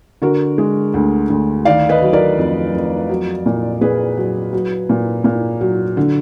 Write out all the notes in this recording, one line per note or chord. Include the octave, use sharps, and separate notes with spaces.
D3 F#4 A#4
G#3
D2
D2
D#3 D5 F5
B4 D#5
F#3
A#4 D5
F2
F2
F#3
A#2
A#2 G#4 B4
F#3
F#3
A#2
A#2
F#3
D3